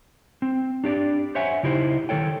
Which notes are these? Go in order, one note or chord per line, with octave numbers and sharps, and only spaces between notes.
C4
D4 G4 D5
C5 C#5 E5 F#5 G#5
C#3 D#4 E4 G4 B4 C5
D#3 G#3 A4 C#5 G5